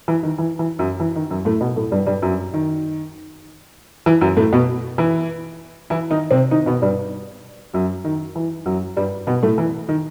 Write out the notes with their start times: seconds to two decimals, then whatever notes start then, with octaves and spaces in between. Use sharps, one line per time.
0.08 E3
0.23 D#3
0.38 E3
0.59 E3
0.79 F#2 F#3
1.00 E3
1.16 D#3
1.30 F#2 F#3
1.45 A2 A3
1.61 B2 B3
1.76 A2 A3
1.92 G2 G3
2.06 G2 G3
2.22 F#2 F#3
2.54 D#3
4.06 E3
4.21 F#2 F#3
4.37 A2 A3
4.53 B2 B3
4.98 E3 E4
5.90 E3 E4
6.11 D#3 D#4
6.31 C3 C4
6.51 D#3 D#4
6.66 B2 B3
6.82 G2 G3
7.74 F#2 F#3
8.05 D#3
8.36 E3
8.66 F#2 F#3
8.97 G2 G3
9.27 B2 B3
9.43 A2 A3
9.58 E3
9.89 D#3